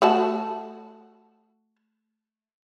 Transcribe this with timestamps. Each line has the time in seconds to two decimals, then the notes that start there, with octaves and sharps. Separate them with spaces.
0.02 A3 F#4 A5